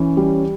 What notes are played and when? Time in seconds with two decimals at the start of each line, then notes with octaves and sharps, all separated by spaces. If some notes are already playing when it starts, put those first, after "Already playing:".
Already playing: E3 C#4
0.17 G3